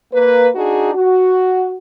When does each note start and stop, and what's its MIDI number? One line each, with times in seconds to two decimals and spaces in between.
0.14 0.49 58
0.14 0.49 71
0.56 0.92 62
0.56 0.92 63
0.56 0.92 66
0.56 0.92 68
0.94 1.76 66